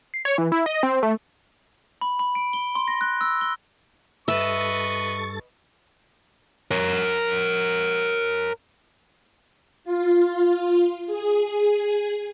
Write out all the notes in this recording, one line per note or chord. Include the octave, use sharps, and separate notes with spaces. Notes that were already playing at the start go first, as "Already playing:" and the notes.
C7
C#5
E3
E4
D#5
C4
A3
B5
B5
D7
G7
C6
A#6
F#6
E6
G7
G2 A4 B4 D#5 E5 C#6 A6
A#4 C#5
F4
G#4